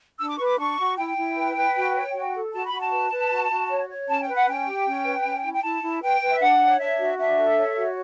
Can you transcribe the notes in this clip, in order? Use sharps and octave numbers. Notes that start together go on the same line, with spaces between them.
D4 E6
D6
B4 C#6
D6
D4 C#6
F#4
E4 G5
E4
B4
B4
F#4
C#5
F#4
A4
F#4 A5
B5
F#4
A5
B4
B4
F#4
F#4
C#5
C#5
C#4 A5
G5
B4
F#5
C#4 G5
G4
C#4
B4
C#4
E4
G5
E4 A5
E4
B4 G5
B4
E5
D4 F#5
C#5
D4 E5
F#4
D4 E5
A4
C#5
F#4